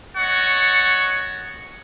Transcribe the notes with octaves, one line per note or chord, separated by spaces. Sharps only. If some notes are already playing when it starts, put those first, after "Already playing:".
C#5 D#5 F#5 A5 C#6